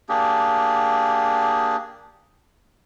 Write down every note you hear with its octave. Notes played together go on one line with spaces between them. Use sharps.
A#3 D4 G4 G#4